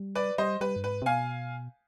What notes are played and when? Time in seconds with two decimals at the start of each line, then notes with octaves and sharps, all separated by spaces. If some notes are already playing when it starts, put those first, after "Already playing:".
Already playing: G3
0.15 B4 D5
0.38 G3 C5 D#5
0.61 G3 B4
0.76 G2
0.84 G#2 B4
1.02 C3
1.06 B2 F5 G#5